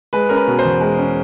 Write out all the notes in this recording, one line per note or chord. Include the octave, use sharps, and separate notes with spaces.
G#3 B4
C#4 A#4
B4
B2
C5
E2
G#3
C#4